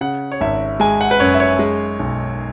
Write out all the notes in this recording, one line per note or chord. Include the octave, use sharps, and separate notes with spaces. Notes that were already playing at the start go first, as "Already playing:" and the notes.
C#3 F#5
C#5
G#1 E5
G#3 G#5
F#5
B4
F#2 C#5
E5
C#5
G#3
B1